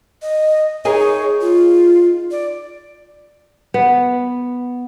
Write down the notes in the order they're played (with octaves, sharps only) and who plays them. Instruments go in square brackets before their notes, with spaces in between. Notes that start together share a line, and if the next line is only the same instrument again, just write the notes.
[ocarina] D#5
[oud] D#4 G#4 A#4 [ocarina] C#5
[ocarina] F4
D5
[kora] B3